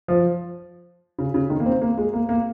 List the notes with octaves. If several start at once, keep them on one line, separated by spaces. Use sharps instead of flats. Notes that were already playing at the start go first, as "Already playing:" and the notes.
F3
C#3
C#3
D#3
A#3
C4
A#3
G#3
A#3
A#3